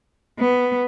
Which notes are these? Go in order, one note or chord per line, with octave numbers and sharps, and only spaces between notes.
B3